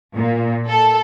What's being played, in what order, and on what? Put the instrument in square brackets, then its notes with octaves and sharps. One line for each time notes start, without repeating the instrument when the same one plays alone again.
[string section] A#2
A4